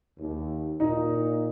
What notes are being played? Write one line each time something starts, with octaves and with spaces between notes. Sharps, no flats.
D#2
A#2 D#4